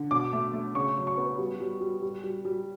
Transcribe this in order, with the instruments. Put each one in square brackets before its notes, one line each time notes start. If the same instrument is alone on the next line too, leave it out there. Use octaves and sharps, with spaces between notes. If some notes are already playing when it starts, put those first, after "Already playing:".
Already playing: [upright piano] D3
B2 D6
A3
A3
C#3 C#6
F#3
C#6
B3
G3
G3
G3
G3
G3
G3